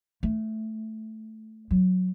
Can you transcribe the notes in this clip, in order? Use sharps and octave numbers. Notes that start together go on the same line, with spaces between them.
A3
F#3